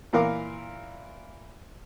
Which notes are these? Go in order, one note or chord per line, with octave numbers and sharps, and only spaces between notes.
A#2 E3 A#4 F5 D6